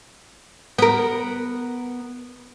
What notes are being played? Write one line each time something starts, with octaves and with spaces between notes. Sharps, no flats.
B3 A#4